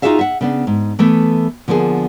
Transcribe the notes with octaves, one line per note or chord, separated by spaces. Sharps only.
D#4 F4 F#4 G#4 E5 F5
E5 F#5
C#3 B3 D4
G#2
E3 A3 B3 A4 B4
D3 F3 A#3 B3 G#4